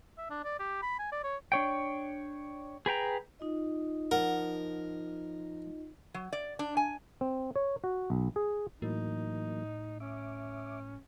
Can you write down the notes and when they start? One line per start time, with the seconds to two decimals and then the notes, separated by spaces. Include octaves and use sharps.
0.18 E5
0.30 D4
0.44 D5
0.59 G4
0.83 B5
0.99 G#5
1.12 D5
1.24 C#5
1.52 D4 C#5 G5
2.86 G#4 B4 G5 A#5
3.40 D#4 F4 D#5
4.11 F3 A#4 F#5
6.14 F#3
6.33 D5
6.59 D4
6.77 G#5
7.21 C4
7.56 C#5
7.84 F#4
8.10 B1
8.36 G#4
8.82 A2 E3 F#3 A#3 D#4
10.00 C#4 E5 D6